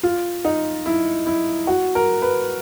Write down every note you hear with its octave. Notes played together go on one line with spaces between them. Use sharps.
F4
D#4
E4
E4
F#4
A#4
B4